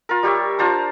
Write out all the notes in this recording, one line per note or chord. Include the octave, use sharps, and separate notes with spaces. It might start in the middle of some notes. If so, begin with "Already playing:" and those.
F4 A#4
G3 G4 C#5 E5
D4 F4 C5 A#5